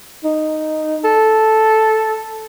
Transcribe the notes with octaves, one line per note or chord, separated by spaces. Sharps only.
D#4
A4